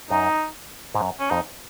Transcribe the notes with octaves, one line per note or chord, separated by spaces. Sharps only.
F#2 D#4
G#2
F#2
C#4
F2 D#4